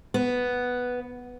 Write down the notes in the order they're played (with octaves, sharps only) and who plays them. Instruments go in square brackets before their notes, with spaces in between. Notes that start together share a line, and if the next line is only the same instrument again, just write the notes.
[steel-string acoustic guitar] B3